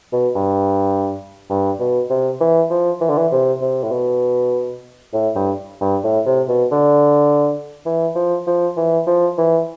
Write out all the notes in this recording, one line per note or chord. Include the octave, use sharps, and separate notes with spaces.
B2
G2
G2
B2
C3
E3
F3
E3
D3
E3
C3
C3
A2
B2
A2
G2
G2
A2
C3
B2
D3
E3
F3
F3
E3
F3
E3